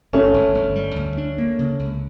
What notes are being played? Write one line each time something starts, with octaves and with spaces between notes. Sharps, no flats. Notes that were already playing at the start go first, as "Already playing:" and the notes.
G1 A3 C#4
G1
G1
G3
D2
D4
A#3
C#3
C#2